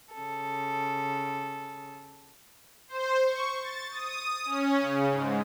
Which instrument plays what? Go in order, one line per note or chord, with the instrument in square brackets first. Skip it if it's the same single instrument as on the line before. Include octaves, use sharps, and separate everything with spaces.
[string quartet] C#3 A4
[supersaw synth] C5
C#6
A6
D#6
C#4
C#3
G#2